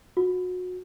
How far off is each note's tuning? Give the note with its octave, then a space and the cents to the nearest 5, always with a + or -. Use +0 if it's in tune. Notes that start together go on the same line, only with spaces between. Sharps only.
F#4 -25